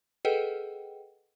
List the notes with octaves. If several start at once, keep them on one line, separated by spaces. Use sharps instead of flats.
G#4 A4 B4 D#5 F#5 G5